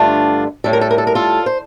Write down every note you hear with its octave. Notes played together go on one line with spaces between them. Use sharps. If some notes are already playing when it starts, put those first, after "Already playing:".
Already playing: G2 D3 A3 D4 F4
A2 G3 A4
A#4
A4
A#4
A4
A#4
F4 A4
C5